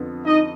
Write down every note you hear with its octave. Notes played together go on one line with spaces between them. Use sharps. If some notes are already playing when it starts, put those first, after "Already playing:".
Already playing: F2 D3 B3
D#4 D#5